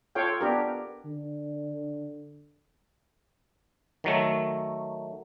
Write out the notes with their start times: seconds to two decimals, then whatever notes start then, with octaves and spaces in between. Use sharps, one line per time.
0.15 F4 A4 C#5 F5 G5
0.41 B3 D4 G4 A#4
1.05 D3
4.04 D#3 F#3 A3